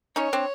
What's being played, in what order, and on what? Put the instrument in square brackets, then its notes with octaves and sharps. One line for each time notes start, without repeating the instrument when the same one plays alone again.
[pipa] C#4 D#4 [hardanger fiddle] C#5
[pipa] C4 D4